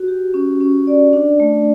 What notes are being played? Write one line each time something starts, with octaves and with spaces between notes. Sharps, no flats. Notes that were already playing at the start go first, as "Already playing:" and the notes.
Already playing: F#4
G4
C#4
C#4
D5
D4
A3